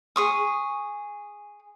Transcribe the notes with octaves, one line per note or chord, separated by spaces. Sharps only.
G#4 C#6 D#6